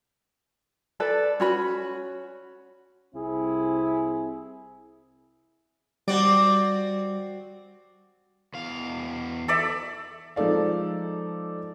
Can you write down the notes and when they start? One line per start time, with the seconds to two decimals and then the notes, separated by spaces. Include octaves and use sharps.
1.00 A4 B4 D5
1.40 C#4 F#4 B5
3.15 C2 C4 E4 G#4
6.08 G3 C4 F#4 D5
8.54 E2 F5
9.48 A4 D5 E5
10.36 F3 G#3 D#4 A4 D5 F5